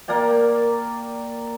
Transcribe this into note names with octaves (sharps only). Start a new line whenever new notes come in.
A#3 A#4 D5 G5